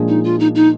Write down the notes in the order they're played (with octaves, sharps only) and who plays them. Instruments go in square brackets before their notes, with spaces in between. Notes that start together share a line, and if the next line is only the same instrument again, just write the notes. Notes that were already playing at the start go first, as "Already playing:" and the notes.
Already playing: [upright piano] A#2 F3 G#3 D4 G#4
[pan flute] D#4
F4
D#4
D#4